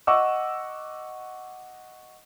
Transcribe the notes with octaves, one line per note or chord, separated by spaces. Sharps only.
D#5 F#5 C#6 D6 E6